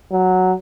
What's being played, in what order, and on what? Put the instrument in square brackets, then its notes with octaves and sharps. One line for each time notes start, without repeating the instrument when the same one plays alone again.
[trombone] F#3